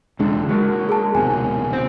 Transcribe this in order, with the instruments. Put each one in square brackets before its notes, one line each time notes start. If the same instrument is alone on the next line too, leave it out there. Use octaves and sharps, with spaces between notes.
[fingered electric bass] E1 G#3 D4 [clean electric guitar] C#2 D3
[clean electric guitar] F#3 A#3 [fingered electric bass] G#3
[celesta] G#4 A5
[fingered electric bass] D1 B1 C3 [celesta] G#5
[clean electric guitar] C4